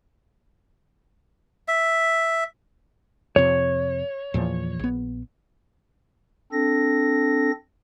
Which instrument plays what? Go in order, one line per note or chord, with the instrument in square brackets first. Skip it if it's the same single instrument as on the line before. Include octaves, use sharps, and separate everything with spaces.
[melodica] E5
[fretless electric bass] F2 C3 [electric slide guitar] C#5
[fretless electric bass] E2 A#2 F3
A#1 B3
[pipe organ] C4 D4 A4 A#6